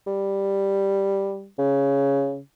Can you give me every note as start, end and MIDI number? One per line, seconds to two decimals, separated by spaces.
0.07 1.48 55
1.59 2.40 49